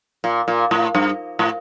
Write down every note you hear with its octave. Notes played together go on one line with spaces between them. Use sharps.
A#2
A#2
A2
G2
A2